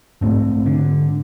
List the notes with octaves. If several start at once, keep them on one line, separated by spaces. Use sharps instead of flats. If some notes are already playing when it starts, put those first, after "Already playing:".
G#2 A3 C4
D3